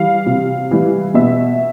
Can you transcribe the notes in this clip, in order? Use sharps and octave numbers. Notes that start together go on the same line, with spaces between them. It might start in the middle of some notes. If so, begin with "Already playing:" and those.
Already playing: E3 G3 F5
C3
E3 G3
B2 E5